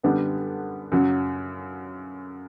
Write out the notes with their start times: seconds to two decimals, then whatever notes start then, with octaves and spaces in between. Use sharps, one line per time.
0.03 F#2 D3 G3 B3 D4
0.92 F#2 C#3 F#3